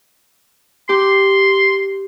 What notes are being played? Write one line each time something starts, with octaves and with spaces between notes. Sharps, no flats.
G4 C6